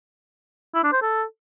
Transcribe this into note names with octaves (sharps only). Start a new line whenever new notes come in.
E4
D4
C5
A4